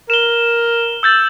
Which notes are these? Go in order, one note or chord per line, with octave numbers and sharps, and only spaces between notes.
A#4 E7 G7
E6 G6 A6